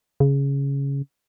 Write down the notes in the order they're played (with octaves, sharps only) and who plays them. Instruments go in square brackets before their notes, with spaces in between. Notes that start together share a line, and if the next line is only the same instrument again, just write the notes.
[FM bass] C#3